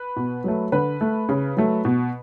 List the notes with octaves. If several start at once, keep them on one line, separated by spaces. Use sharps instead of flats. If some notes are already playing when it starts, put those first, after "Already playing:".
Already playing: B4
B2
F#3 A3
D3 B4
A3
C#3
F#3 A3
B2